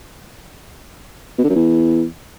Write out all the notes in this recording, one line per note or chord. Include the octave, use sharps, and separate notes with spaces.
B2
D3
F#2
E2